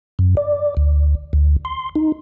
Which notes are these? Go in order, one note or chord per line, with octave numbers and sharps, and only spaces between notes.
F#2
D5
D2
D2
C6
D#4